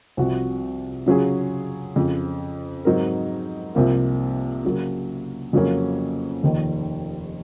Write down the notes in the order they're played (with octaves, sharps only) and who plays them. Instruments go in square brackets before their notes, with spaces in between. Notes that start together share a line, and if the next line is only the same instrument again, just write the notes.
[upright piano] C2 C3 F3 C4 F#4
C#3 F#3 C#4 F4 G#4
F2 C#3 F3
G#2 F#3 C4 D#4 A#4
C2 C3 F3 A#3
C#3 F#3 A#3
F2 C#3 F#3 A#3 C#4
F1 D#2 D#3